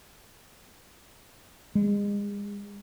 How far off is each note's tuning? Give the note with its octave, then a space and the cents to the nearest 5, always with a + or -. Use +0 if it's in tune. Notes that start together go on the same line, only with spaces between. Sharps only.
G#3 -35